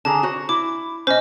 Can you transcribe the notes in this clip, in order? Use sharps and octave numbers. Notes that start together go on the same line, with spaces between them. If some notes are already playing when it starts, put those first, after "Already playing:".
D3 G#4 A5 A#5
F#4 C5
E4 D6
B2 C#4 C5 D#5